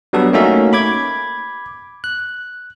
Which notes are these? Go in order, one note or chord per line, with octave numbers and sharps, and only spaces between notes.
F#3 G3 B3 D4 A4
A3 A#3 C#4 D#4 F#4 E5
B5 D6 G#6
F#6